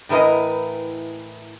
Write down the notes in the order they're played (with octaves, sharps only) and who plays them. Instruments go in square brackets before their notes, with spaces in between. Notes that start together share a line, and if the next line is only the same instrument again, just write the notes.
[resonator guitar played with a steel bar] A2 E3 A#4 B4 D#5